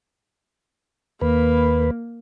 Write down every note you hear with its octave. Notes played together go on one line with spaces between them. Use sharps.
D#2 A#3 B4